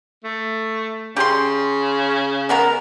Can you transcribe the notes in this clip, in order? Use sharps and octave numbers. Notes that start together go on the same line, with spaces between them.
A3
C#3 G4 C6
G#3 B3 A#4